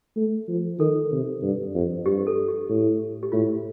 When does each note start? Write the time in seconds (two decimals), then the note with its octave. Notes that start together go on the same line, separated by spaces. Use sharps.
0.16 A3
0.48 F3
0.79 D#3 A4
1.12 C3
1.43 G2
1.75 F2
2.06 G2 G4
2.27 A4
2.48 G4
2.69 A2
3.23 G4
3.32 A2 F4